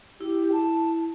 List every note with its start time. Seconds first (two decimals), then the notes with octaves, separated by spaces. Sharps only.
0.21 E4 G4
0.53 A5